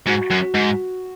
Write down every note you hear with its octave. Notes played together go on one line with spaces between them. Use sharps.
G#2 F#4
F#2
G#2